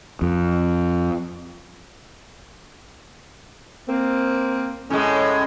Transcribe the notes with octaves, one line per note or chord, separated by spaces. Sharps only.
F2
A#3 C4
A2 G#3 C#4